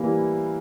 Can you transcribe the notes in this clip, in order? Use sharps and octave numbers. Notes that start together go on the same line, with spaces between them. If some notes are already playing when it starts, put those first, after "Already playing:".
Already playing: E3 G3 A#3 E4